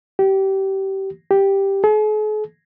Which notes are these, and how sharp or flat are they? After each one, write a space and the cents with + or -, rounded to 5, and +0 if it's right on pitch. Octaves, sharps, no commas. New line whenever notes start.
G4 -25
G4 +0
G#4 +45